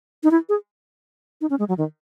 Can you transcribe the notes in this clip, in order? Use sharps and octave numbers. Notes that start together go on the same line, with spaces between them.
D#4
E4
G#4
D#4
C#4
G#3
F#3
D#3